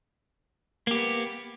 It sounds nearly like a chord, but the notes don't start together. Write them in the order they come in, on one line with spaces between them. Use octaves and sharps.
A#3 G4 B3